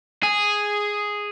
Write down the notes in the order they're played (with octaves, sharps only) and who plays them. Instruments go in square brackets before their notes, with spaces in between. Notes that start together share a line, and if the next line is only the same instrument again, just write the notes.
[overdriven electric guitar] G#4